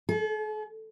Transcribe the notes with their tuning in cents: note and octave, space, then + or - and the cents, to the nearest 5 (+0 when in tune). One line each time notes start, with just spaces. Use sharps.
A4 -45